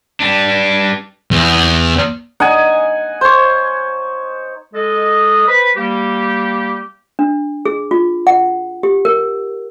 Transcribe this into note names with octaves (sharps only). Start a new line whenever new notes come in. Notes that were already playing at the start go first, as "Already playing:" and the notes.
G3 D4
E2
D#4 F#5 G#5
C5 C#5
G#3 A4 D#5
B4 C5 B5
G3 A#3 G4
D4
G#4
F4
F#5
G4
A#4